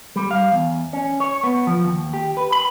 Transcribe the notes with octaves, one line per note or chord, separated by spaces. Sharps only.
G3
F5
E2
C#4
C#5
B3
F3
D#2
G4
B4
B5